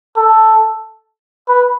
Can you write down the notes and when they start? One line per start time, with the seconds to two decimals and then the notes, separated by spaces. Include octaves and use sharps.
0.17 A4
1.49 B4